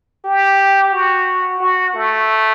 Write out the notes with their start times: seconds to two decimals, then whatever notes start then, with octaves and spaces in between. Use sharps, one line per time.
0.24 G4
0.92 F#4
1.60 F#4
1.94 A3